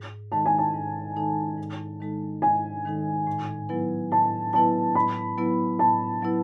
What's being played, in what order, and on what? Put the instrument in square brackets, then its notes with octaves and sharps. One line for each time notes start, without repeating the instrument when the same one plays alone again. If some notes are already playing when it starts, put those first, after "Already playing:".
Already playing: [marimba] G#2
[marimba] D#3 G#3 D#4 A4 [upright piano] A5
[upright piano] G#5
A5
[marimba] G#2
D#3 G#3 D#4 A4
G#2
D#3 G#3 D#4 A4
[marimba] G#2 [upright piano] G#5
[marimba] D#3 G#3 D#4 A4
A2
F#3 B3 E4 B4
[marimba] A2 [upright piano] A5
[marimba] F#3 B3 E4 B4 [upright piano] A5
[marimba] A2 [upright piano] B5
[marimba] F#3 B3 E4 B4
[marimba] A2 [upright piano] A5
[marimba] F#3 B3 E4 B4